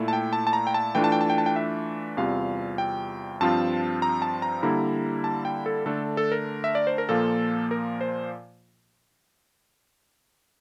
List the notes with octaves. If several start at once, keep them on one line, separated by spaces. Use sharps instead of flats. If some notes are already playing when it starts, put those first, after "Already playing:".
Already playing: A#2 A3 E4
A5
G5
A5
A5
A#5
G5
A5
E3 A3 D4 F4 G5
A5
G5
A5
G5
A5
G5
E5
E2 C3 G3 C4 F4 F5
G5
G2 F3 C4 F4 A5
A#5
A5
A#5
D3 G3 A#3 E4 A#5
A5
G5
A4
D3 A3 D4 A4
A4
A#4
E5
D5
C5
A#4
A#2 F3 A#3 F4 A4
A#4
C5